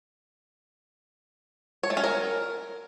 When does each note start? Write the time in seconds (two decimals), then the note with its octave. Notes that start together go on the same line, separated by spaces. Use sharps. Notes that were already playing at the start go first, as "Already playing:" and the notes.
1.83 C#5
1.90 A3
1.97 C#4
2.04 A#4